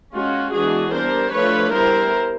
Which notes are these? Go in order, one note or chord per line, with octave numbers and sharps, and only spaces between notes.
G#3 C#4 F4 F#4
E3 G#3 B3 D4 F#4 G#4
G3 B3 D4 A#4 C5
F3 A3 D4 F4 B4 C#5
G3 B3 E4 A#4 C5